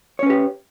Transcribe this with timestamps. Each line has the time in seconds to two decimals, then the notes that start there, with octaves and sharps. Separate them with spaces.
0.19 C#5
0.23 C#4
0.26 B4
0.30 G4